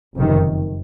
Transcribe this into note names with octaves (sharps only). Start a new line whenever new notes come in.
F#1 F2 C3 D#3